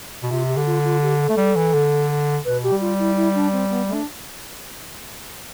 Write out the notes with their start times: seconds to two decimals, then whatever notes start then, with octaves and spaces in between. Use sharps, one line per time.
0.23 B2
0.30 C3 F4
0.48 G4
0.57 D3
0.66 F4
0.84 F4
1.02 G4
1.19 A4
1.29 A3
1.37 G3
1.56 E3
1.73 D3
2.44 B2 B4
2.63 G4
2.72 G3
2.80 F4
2.98 E4
3.16 E4
3.34 D4
3.52 C4
3.70 B3
3.88 A3
3.94 D4